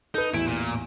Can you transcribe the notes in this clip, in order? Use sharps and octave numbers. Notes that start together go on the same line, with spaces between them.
D#4 A4 B4
A1 E2 E4 D7
A#2